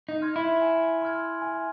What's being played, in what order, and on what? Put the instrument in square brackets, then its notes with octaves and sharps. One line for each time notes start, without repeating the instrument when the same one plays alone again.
[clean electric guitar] D#4
[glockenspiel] C6 F6 G#6
[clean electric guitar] E4
[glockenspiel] G#5
C6 F6 G#6
G#5